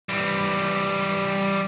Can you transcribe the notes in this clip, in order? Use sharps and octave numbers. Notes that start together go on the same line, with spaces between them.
E3 G3